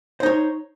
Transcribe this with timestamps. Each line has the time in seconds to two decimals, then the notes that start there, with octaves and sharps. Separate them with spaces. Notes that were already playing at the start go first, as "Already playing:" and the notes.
0.20 C5
0.23 D#4
0.26 C#5